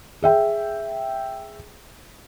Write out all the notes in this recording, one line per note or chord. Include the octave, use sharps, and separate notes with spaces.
G#4 E5 G5